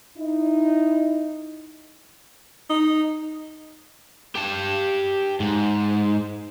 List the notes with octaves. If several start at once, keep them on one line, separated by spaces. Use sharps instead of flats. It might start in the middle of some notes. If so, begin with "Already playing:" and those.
D#4 E4 D#5
D#4
G4 A5
G#2